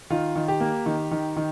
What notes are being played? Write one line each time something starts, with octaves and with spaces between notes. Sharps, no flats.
D#3 F4
D#3
G4
A#3
D#3
D#3
D#3